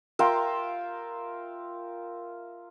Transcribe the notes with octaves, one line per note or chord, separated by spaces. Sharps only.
F4 A#4 E5 G5